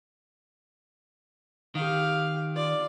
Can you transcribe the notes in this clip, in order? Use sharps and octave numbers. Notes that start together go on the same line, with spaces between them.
D#3 G4 F5
F4 D5